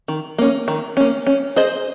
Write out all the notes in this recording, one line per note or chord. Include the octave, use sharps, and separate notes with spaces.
D#3
A#3 C#4
D#3
A#3 C#4
C#4
G#4 C5 D#5